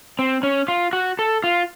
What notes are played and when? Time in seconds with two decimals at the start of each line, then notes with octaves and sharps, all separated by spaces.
0.19 C4
0.43 C#4
0.68 F4
0.93 F#4
1.19 A4
1.44 F4